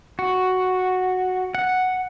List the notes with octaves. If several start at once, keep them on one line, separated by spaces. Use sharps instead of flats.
F#4
F#5